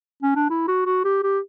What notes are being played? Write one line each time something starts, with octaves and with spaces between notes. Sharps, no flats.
C#4
D4
E4
F#4
F#4
G4
G4